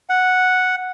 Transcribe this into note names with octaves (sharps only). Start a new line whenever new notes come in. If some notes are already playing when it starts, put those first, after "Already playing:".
F#5